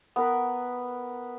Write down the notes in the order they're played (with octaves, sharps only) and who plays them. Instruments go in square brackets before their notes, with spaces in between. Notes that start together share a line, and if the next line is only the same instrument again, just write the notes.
[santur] B3 A#4 B4